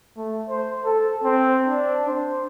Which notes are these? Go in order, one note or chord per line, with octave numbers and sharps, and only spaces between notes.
A3
C5
A4
C4
D4
C5